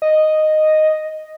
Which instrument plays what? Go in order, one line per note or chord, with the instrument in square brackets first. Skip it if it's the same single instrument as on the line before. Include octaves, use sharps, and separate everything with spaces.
[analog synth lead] D#5